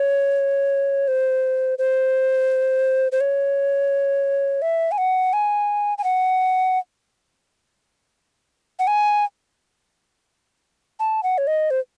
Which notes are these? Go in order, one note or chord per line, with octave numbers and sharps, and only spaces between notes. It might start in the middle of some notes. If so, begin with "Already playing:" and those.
Already playing: C#5
C5
C5
C5
C#5
E5
G#5
F#5
G#5
G#5
F#5
F#5
G#5
A5
F#5
C#5
D#5
C5